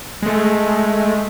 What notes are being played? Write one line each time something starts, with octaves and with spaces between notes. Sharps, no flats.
G#3 A3